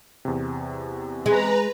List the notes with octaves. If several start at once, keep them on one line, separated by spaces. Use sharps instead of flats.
E2 C3
G#3 B4 A#5